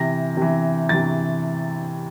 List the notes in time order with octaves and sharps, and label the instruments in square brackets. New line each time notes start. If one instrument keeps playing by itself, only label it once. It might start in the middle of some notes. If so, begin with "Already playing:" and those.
Already playing: [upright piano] C3 E3 A#6
C3 E3
C3 E3 A6